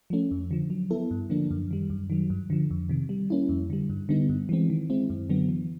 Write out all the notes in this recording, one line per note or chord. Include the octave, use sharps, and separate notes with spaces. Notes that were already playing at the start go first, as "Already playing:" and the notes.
F3 A3 C#4
F2
D3 F3
F#3
B3 E4 A4
G2
D3 F3 A#3 D4
F#2
D#3 G3
F#2
D#3 F#3
G2
D3 F3
F2
C3 D#3
G3
A#3 C#4 E4
F2
D3 G3
G2
D3 G3 B3 D#4
G2
E3 G#3 C4
D#3
G#3 C4 E4
F#2
D3 F#3 B3
E3